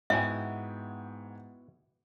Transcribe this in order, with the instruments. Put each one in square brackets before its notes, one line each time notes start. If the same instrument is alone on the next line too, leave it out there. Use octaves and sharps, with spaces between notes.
[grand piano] G#2 G5 G#5 [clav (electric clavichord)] B3 E4 F#4 [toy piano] E5